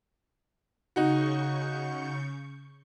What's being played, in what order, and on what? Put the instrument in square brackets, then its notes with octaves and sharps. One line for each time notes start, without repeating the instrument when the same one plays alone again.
[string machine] C#3 C#6 G6 [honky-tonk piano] D#4 F#4